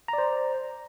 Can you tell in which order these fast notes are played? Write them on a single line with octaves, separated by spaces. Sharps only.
A#5 D5 C5